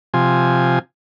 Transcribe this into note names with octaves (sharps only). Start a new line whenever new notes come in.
C3 F3 G#5